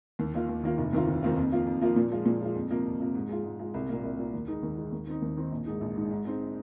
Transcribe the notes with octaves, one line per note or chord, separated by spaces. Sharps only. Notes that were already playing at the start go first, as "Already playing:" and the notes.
D#2
D#3 A#3 F4
D#2
D#3 A#3 F4
F1
D#2 D#3 C4 F4
F1
D#2 D#3 C4 F4
F2
F3 A#3 F4
F2
F3 A#3 F4
A#2
F3 G#3 F4
A#2
F3 G#3 F4
F2
C3 F3 A#3
F2
C3 F3 A#3
G#2
G#3 F4
G#2
G#3 F4
C2
A#2 A#3
C2
A#2 A#3
D#2
D#3 G#3 D#4
D#2
D#3 G#3 D#4
D#2
D#3 C4 D#4
D#2
D#3 C4 D#4
A#1
G#2 G#3 D#4
A#1
G#2 G#3 D#4
G#2
G#3 C4 D#4